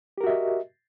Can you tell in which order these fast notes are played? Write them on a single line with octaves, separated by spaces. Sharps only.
G4 A#4 F#4 E5 D#5